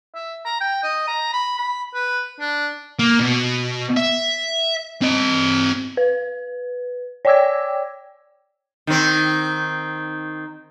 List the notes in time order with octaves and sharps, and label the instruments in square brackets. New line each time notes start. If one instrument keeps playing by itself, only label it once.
[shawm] E5
A#5
G5
D#5
A#5
B5
B5
B4
D4
[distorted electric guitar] A#3
B2
E5
C4 D#5
[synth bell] B4
C#5 D5 G5 D6 E6 G#6
[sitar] D#3 C4